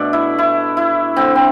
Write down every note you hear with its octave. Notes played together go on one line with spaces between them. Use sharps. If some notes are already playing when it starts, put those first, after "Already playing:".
Already playing: B2 A3 D4
E4
E4
E4
D3 A3 C4
C4